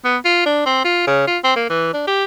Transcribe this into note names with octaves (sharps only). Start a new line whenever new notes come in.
B3
F4
D4
C4
F4
C#3
F4
C4
A#3
E3
D4
G4